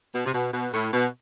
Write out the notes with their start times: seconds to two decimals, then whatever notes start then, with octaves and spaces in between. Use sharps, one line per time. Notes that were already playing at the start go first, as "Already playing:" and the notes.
0.13 B2
0.25 C3
0.33 B2
0.53 B2
0.73 A2
0.92 B2